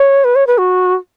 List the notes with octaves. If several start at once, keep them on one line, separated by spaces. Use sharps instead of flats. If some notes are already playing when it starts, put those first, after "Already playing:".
Already playing: C#5
B4
C#5
B4
F#4